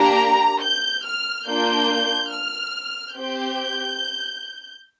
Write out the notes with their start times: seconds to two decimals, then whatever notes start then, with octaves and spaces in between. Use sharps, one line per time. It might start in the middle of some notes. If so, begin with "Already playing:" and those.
Already playing: A#3 D4 G4 A#5
0.63 G6
1.05 F6
1.47 A#3 D4 F4 G6
2.33 F6
3.18 C4 G4 G6